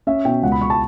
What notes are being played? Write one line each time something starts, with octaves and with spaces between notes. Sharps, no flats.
C#4 E5
B2 G5
C#2 F#5
B5
C#2 C#6
A5